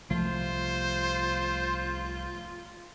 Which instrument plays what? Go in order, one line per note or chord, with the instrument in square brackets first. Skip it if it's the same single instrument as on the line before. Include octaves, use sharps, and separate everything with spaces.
[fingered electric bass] C2 F3 A3 [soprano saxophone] F4 [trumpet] C5